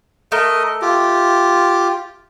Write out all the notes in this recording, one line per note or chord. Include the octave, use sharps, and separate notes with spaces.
A3 A#4 D#5
F4 G4